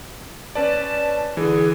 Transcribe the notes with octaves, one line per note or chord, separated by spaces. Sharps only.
C#4 B4 D5 A5
D3 E3 G#4